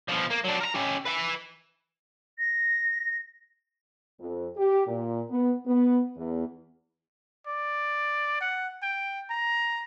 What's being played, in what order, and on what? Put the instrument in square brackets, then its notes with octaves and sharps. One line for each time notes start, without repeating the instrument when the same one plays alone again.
[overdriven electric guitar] B2 F3
A#3
F#3 D4
A#4 A#5
C#4 G4
B4 E5
[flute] A#6
[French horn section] F2
G4
A#2
B3
B3
E2
[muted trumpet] D5
F#5
G5
A#5